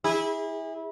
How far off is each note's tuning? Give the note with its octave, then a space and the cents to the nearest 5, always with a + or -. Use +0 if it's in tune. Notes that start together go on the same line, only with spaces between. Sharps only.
E4 -25 G#4 -30